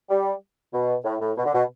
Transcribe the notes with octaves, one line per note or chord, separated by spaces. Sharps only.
G3
B2
A2
A2
B2
D3
B2